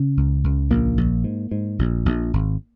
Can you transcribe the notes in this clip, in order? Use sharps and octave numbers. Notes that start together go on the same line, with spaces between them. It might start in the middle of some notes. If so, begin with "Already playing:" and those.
Already playing: C#3 C#4
C#2
C#2
A#1 A#3
A#1
G#2
G#2
A#1
A#1
G#1